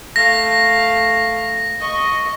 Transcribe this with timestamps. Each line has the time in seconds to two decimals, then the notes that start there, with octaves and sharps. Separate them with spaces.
0.16 A3 F5 A#6
1.80 D#5 C#6